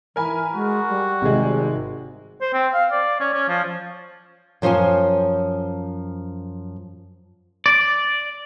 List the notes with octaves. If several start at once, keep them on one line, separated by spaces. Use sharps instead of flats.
E3 A#4 G#5 B5
G#3 F#4
G3
G#1 C3 G#3
C5
C4
F5
D5
C#4
C#4
F3
F#2 F3 C5 C#5 G#5
D5